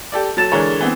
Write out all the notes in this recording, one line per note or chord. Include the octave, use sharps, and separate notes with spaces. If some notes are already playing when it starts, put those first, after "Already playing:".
G4 A4 D5
F#3 A4 A6 E7
D3 E3 G#3 A#4 C#5
E3 B3 C4